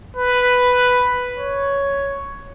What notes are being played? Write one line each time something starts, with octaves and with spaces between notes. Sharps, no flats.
B4
C#5